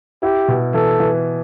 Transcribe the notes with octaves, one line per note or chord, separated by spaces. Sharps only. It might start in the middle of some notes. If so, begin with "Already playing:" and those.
E4 G4
B2
E3 A4
E3